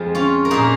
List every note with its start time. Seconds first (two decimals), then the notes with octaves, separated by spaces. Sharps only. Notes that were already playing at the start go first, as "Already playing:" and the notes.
Already playing: F2 F3 G#3
0.15 C#4 F4
0.45 A#4
0.51 A#2 A#3 D#4 G#4